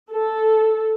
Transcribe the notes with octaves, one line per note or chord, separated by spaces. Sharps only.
A4